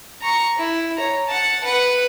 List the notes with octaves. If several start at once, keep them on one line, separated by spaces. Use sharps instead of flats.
A#5 C#6
E4
C#5 A#5
F#5 A5
B4 F#5